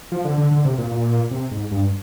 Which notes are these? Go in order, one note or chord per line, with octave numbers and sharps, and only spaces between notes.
F3
D3
D3
D3
C3
A#2
A#2
C3
G#2
G2